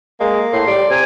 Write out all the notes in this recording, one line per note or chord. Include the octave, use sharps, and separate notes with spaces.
G#3 A#3
A2 C6
G3 D5
C3 G#5